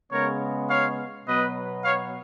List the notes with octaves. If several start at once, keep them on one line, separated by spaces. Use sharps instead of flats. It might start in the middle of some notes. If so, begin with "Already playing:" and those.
C#3 G#3 B3 A#4 C#5
C#5 F5
B2 F#3 B3 B4 D#5
C#5 F5